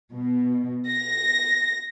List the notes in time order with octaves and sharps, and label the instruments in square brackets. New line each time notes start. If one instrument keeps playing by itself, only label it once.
[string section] B2
A#6